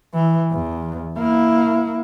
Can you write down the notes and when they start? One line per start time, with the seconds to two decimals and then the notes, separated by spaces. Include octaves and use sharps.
0.14 E3
0.52 E2
1.18 A#3 E4